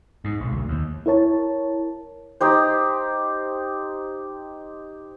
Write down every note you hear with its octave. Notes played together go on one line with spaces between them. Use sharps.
G#2
B1
D2
D#2
E4 A#4 C#5 A5
D#4 G4 C5